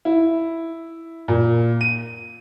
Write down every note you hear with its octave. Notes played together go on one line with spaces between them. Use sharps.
E4
A#2
D#7